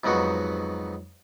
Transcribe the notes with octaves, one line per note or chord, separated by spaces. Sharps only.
F2 G#2 F#3 B3 D#4 F#4